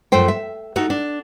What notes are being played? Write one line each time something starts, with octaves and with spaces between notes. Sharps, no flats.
F#2 F3 A3 C5 G5
E5
A3 D#4 F#4
D4